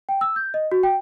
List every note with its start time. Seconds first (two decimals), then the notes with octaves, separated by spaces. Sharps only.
0.09 G5
0.21 E6
0.36 G6
0.54 D#5
0.72 F#4
0.83 G5